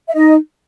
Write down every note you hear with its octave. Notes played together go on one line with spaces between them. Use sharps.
E5
D#4 D#5